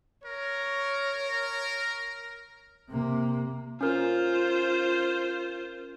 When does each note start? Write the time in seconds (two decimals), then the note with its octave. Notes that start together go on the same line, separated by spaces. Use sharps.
0.26 A#4 C#5
2.89 C3 A#3
3.81 C#4 F4 A#4 C5